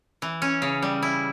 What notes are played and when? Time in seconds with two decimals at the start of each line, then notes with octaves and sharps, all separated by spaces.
0.22 E3
0.42 C#4
0.62 C#3
0.82 G3
1.03 E4